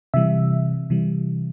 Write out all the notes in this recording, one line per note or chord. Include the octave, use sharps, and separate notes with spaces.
C3 E3 G3 E5
C3 E3 G3